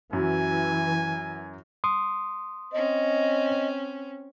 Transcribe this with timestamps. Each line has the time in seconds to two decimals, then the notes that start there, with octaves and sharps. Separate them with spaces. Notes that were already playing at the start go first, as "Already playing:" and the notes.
0.13 F#2 E3 F#3 G#5
1.84 C6 D#6
2.73 C4 C#4 D#5